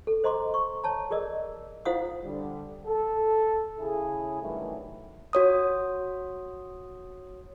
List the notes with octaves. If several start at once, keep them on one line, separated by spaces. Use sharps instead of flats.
A4
C5 D#5 A#5 C6 D6
C#6
C#5 A5 A#5
G#4 A#4 D5 D#5 E6
E4 F4 C5 F5 F#5 D#6
D3 G3
A4
C#3 E4 G#4
G2 D#3 E3 F#3 G3 A3
F#4 C#5 D#6